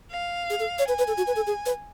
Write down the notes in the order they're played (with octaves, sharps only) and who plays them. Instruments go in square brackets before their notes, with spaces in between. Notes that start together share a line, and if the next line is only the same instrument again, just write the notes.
[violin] F5
[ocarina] G#4
A4
C#5
[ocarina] B4 [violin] G#5
[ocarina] B4
A4
F#4
B4
A4
G#4
B4